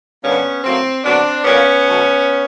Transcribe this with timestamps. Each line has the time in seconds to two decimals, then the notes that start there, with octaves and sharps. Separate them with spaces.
0.23 G2 D3 G3 A#3 B3 C#4
0.64 A2 F#3 A#3 C4
1.04 D3 F#3 B3 C4 D4
1.44 A#2 G3 A#3 B3 C#4
1.85 B2 F#3 A3